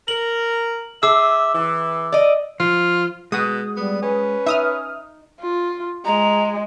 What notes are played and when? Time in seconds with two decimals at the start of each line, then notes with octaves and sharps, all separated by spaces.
0.08 A#4 F#7
1.03 G#4 E5 D6 E6
1.53 E3
2.12 D5 D#5
2.60 F3 F4
3.32 B2 G#3 F#4 D#6
3.77 G3 B3
4.02 C#4 B4
4.46 D#4 E5 D#6 F6
5.41 F4
6.05 G#3 A#5